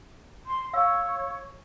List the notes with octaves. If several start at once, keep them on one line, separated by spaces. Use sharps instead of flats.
C6
C#5 F5 E6